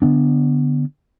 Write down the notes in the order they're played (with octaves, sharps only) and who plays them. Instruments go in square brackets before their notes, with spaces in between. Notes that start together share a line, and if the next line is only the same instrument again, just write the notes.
[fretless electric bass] D3 B3 D4